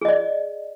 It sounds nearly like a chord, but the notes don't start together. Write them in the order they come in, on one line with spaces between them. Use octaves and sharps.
G#4 D#5 D5